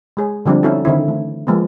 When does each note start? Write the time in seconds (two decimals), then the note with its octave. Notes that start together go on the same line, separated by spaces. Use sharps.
0.17 G#3 G#4 C#5
0.46 D3 F3 G3 C4 D4
0.63 C4 C#4 D#4 E4 F#4 A4
0.85 D3 D#3 C4 E4
1.08 E3 A3
1.47 F3 G#3 A#3 B3